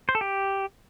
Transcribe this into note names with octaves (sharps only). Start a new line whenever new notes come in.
C5
A4
G4